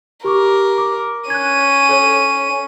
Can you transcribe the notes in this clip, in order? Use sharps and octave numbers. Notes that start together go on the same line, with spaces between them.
G4 A#4 C#6 D6
D6
C#4 F#6 G#6 D#7
A4 C#5